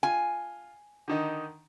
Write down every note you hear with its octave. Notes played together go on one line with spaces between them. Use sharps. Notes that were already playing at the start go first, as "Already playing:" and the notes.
F4 G#5
D3 D#3 D#4